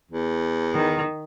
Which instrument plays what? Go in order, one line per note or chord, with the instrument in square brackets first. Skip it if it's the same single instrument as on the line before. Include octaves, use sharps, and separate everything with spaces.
[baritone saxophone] E2
[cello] D#3